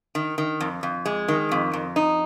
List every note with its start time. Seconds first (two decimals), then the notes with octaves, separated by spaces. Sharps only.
0.15 D#3
0.38 D#3
0.61 F2
0.83 F2
1.06 G#3
1.28 D#3
1.52 F2
1.73 F2
1.96 D#4